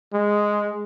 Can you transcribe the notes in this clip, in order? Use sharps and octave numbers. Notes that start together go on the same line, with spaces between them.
G#3